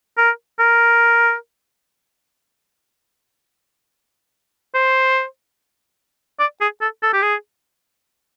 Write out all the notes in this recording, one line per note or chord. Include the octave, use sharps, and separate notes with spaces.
A#4
A#4
C5
D5
G#4
A4
A4
G4
G#4